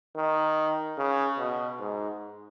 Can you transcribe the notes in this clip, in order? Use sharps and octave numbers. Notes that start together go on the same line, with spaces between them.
D#3
C#3
B2
G#2